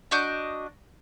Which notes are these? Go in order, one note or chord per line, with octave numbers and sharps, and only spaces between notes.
D4 F#4 D#5 G6